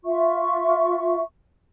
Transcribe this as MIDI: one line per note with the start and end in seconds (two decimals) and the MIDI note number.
0.05 1.21 65
0.05 1.21 76
0.05 1.21 85